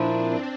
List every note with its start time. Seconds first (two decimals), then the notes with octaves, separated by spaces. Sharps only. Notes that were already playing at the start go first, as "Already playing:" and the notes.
Already playing: A#2 F3 A#3 D4 E4
0.16 C4